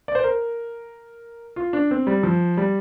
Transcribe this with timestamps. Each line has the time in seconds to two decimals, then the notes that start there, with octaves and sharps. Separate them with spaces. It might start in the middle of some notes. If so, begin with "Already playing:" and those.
0.08 D5
0.15 C5
0.24 A#4
1.56 F4
1.73 D4
1.91 C4
2.07 G3
2.23 F3
2.57 G3